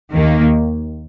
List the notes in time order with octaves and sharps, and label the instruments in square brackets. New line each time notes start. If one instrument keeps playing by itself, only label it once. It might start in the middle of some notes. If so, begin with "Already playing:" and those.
[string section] D#2 D#3 A#3